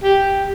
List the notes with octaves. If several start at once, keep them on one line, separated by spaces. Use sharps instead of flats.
G4